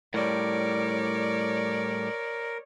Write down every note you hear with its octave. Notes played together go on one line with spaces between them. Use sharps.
A2 G3 A#4 C#5 D5